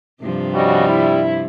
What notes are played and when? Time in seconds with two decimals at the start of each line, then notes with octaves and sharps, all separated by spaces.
0.22 G2 C3 F3
0.53 C#3 G3 F#4 D#5
0.88 E4